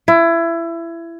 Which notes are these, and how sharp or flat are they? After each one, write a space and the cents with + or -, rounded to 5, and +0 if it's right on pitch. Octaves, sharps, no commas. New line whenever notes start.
E4 +25